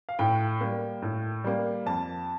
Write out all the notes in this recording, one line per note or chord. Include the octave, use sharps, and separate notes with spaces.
F5
A2 G5
G3 A#3
A2
G3 A#3
F2 A5